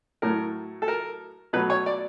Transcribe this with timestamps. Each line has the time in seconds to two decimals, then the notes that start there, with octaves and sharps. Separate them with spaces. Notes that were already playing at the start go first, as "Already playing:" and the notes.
0.22 A2 F#3 A3 A#4
0.82 A4
0.88 A#4
1.53 B2 F#3 A3 B4
1.70 C#5
1.86 D5